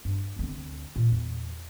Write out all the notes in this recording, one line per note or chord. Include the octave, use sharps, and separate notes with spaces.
G2
D2 C4
A#2
E2